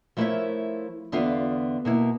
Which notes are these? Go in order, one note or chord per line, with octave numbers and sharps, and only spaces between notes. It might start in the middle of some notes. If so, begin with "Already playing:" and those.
F3 A3 E4 A#4 C#5 E5
E2 D3 B3 F4 E5 F5
B2 A#3 E4